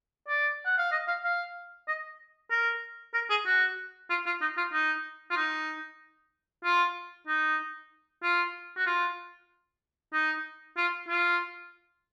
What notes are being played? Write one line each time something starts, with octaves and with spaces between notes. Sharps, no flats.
D5
F#5
F5
D#5
F5
F5
D#5
A#4
A#4
G#4
F#4
F4
F4
D#4
F4
D#4
F4
D#4
F4
D#4
F4
F#4
F4
D#4
F4
F4